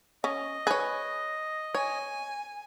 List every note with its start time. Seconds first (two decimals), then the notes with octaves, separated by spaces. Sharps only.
0.24 C#4 D#5
0.67 G#4 B4 C#5
1.75 C#5 G#5